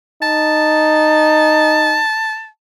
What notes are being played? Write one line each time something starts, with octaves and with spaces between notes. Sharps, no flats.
D#4 A5